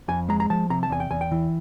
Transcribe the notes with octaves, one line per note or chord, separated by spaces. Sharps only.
F2 G#5
G#3 A#5
A#5
F3 A5
C3 A#5
A5
E2 G#5
G5
E2 G#5
G5
E3